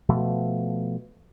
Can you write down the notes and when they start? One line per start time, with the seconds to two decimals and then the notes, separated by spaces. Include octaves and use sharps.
0.09 B2 F3 A3